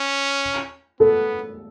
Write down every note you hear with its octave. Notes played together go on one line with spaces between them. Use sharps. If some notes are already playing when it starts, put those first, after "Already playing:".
Already playing: C#4
B3 A4